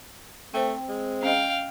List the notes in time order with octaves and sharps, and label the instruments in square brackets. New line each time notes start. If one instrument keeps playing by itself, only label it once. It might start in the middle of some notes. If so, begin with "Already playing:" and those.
[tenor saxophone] A3 [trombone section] C4 [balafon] C5 G5
[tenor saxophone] G#3
[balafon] C#4 D#5 [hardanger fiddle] F5 G5